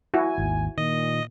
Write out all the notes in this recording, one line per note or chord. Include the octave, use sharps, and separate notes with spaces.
E4 F#4 G#5
G#1 D#2
A#2 D#3 D#5